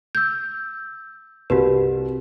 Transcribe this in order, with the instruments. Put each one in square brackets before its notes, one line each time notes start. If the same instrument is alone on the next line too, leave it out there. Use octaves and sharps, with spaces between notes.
[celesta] E6 G6
[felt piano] C2 [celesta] F#4 G4 B4